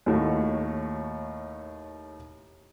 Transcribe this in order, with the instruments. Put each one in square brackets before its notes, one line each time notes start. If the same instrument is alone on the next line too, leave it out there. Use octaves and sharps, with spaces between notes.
[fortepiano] D#2 A2 F#4